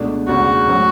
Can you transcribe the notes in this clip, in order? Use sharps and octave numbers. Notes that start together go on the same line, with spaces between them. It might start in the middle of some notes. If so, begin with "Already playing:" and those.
Already playing: C#2 B2 A3 D4
E1 D2 C#3 F#4
A2 F#3 C#4